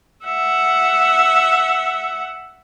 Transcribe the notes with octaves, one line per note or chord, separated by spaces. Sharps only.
E5 F#5